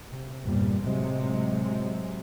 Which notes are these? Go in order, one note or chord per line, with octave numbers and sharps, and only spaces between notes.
C3
G1 E2 A#2 G3
A2 C3 F#3 G#3